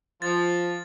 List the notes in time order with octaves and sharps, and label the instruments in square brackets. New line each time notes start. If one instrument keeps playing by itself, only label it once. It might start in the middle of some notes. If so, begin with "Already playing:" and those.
[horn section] F3 [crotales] A6